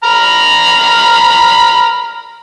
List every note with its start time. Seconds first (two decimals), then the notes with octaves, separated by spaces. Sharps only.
0.04 A#5 B5 F6